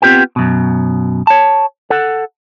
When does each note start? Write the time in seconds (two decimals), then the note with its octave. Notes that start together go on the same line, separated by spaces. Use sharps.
0.02 B3 C4 F4 G4 B4 G5
0.36 F#2 B2
1.27 C#5 A5
1.90 A4 F#5